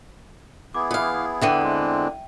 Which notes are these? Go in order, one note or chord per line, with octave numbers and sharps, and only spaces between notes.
B3 E4 G#4 D6
E3 F5
E2 D3 E3 E5 G5 D#7
G#3 C4